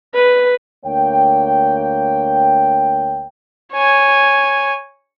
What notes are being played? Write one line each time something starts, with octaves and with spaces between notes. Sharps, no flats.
B4
D2 A#3 C#5 G5
C#5 G#5